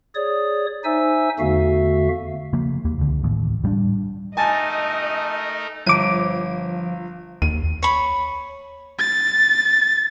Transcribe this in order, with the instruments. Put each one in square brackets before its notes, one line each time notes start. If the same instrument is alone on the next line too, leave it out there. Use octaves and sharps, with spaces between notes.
[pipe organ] G#4 C#5 D5 D#6
D#4 C5 E5 G#5 E6
E2 D3 A3 F#4 E5 F5
[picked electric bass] C#3 F3 A#3
D#2 A#3
C#2 D3
D1 A1 D#2
A2 G3 C#4 D4
[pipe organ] A3 D#4 A#4 [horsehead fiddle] D#5 [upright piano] G#5 A5 A6
[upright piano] G1 [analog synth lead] F3 [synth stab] D6 D#7
[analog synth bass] D#2 [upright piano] D#7
[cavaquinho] C#5 B5
[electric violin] A6